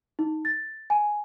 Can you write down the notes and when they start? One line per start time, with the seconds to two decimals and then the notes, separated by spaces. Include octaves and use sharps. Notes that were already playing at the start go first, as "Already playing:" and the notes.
0.19 D#4
0.45 A6
0.90 G#5